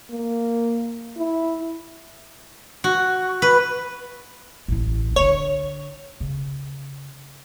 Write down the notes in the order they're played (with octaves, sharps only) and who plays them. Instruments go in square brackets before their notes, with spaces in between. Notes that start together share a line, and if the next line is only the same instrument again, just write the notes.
[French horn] A#3
E4
[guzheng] F#4
B4
[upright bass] A1 E4
[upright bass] D3 D4 [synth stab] C#5
[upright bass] C#3